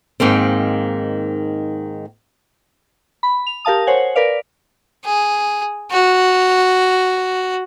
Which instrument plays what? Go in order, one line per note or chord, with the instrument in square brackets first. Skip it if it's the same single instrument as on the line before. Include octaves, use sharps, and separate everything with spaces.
[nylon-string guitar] G#2 D#3 A#3 C4
[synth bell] B5
F7
G4 A#4 F5 A5 D#6
C5 C#5 F#5 G#5
A#4 B4 D5 F5
[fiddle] G#4
F#4